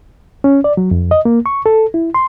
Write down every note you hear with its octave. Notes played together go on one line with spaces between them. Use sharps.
C#4
D5
F#3
F2
D#5
A#3
C#6
A4
E4
C6